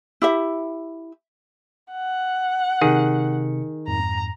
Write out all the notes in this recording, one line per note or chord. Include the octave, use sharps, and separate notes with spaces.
E4 G4 E5
F#5
C3 D#3 G#4 C#7
F2 G#2 A#5